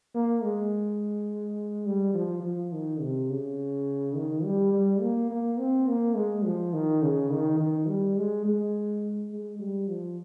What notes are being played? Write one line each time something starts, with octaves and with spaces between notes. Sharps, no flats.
A#3
G#3
G3
F3
F3
D#3
C3
C#3
D#3
G3
G3
A#3
A#3
C4
A#3
G#3
F3
D#3
C#3
D#3
D#3
G3
G#3
G#3
G#3
G3
F3